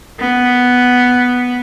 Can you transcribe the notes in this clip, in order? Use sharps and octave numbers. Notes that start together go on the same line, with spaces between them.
B3